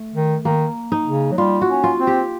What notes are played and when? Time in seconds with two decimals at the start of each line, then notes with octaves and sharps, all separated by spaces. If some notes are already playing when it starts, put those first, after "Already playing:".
Already playing: A3
0.14 D#3
0.44 D#3 A#3
0.92 D#4
1.07 C#3
1.32 F#3
1.38 G3 F4
1.61 F#4
1.69 C#4
1.84 F4
2.00 C4
2.07 G4